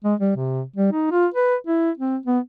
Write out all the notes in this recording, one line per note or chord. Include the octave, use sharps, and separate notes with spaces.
G#3
G3
C3
G3
D#4
F4
B4
E4
C4
B3